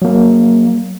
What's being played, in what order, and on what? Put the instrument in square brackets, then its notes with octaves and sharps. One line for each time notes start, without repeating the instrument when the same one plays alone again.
[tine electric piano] F#3 A#3